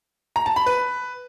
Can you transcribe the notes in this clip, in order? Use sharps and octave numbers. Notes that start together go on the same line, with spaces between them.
A#5
A5
B5
B4